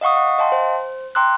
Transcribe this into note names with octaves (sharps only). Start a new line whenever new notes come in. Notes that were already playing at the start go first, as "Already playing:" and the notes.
D#5 F5 F#5 C#6 D#6
F#5
D#5 F5 G5 A5 C6
C5
G5 A#5 C6 D6 E6 F#6